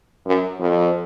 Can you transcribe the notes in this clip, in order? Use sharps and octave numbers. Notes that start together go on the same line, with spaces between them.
F#2
F2